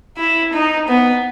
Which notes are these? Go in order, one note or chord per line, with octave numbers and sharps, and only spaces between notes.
E4
D#4
B3